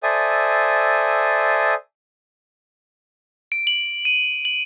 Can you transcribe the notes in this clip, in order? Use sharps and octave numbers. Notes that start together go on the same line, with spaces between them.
A4 C5 D5 E5 G#5 D#6
D7
F#7
D#7
F#7